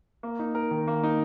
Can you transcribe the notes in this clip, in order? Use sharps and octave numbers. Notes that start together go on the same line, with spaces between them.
A#3
D#4
A#4
D#3
A#3
D#4